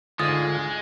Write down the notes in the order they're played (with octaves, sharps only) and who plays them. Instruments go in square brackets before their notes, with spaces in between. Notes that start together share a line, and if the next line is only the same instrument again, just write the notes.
[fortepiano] D2 G#2 [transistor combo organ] D3 F4 [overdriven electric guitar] G#3 [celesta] D#6 A6